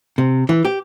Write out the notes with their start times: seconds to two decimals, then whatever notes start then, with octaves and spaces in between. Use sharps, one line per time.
0.18 C3
0.49 E3
0.65 G4